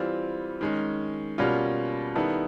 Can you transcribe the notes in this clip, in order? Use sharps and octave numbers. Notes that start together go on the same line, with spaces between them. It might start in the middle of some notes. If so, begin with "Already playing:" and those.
Already playing: E3 G3 C4 F4
D#3 G#3 C#4
B2 G3 A#3 C#4 F4
D#3 G3 B3 E4 A4